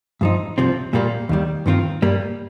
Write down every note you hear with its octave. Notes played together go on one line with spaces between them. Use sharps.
G2 F3 D#4
C2 C3 F3 C4
A#2 G3 A#3
D#2 D#3 G3
G2 D#3 C4 F4
G2 G3 A#3